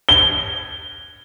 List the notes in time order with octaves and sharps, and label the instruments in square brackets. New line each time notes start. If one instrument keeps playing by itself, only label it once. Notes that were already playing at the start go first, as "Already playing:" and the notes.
[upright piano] G7